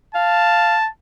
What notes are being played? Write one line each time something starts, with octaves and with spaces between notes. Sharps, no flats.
F5 A5